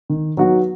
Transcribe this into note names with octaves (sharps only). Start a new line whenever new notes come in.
D#3
F#3 B3 D#4 F#4